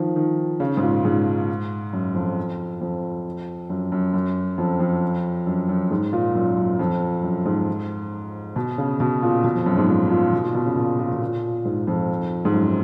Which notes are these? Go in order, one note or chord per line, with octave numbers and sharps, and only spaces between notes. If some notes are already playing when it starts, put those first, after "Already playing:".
Already playing: D#3 F3
D#3
C#3
G#2
A#2
G#2
F#2
F2
F2
F#2
F#2
F#2
F2
F2
F#2
F#2
G#2
A#2
F#2
F#2
F2
F#2
G#2
B2
C#3
B2
A#2
B2
F2
F#2
G#2
A#2
A#2
B2
A#2
B2
C#3
A#2
A#2
B2
A#2
G#2
F2
G#2
F#2